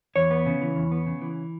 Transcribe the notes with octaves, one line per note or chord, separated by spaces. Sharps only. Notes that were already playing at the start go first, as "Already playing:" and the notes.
E2 C#5
B3
C#3
E3
E2
B3
C#3
E3